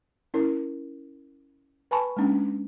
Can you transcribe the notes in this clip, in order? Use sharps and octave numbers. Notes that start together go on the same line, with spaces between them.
C#4 E4 A#4
B4 G#5 A5 B5 C#6
G#3 A#3 C#4 D4